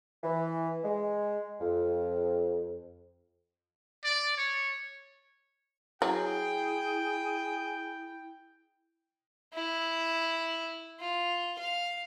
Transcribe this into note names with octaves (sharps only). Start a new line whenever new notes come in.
E3
G#3
F2
D5
C#5
F#3 E4 G#4 G5
E4
F4
F5